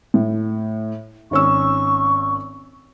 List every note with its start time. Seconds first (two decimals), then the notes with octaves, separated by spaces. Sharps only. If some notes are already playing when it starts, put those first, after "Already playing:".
0.14 A2
1.31 G#1 C#4 C#6 E6